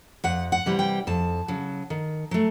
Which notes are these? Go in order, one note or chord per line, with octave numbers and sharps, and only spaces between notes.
F2 F#5
F#5
C3 E3 G3
G5
F2 A5
C#3 F#3
D#3
F#3 A3